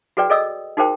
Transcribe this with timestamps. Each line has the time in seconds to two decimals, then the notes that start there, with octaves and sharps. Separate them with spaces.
0.17 F#4 G#4 B4 D5 G5
0.30 G#4 A4 D5 D#5 D#6 E6
0.77 D#4 F#4 G#4 A#4 C5 G5